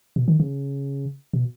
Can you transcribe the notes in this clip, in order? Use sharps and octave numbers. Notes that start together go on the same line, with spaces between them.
B2
D#3
C#3
B2